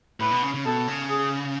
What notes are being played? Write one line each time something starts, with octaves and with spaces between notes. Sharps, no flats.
A2 B4
B2
C#3
C#3
B2 A4
C#3
G#4